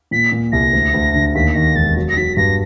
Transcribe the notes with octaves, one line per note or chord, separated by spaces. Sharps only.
A#2 B6
A#2
C2 A#6
D2
D2
D3
D#2 B6
D#3 A#6
E1 A6
F#3
A#6
F#3 B6
G2 A#6